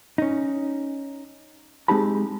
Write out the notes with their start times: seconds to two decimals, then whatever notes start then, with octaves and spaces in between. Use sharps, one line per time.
0.18 C#4 D#4
1.88 G#3 C4 D#4 G4 A5 B5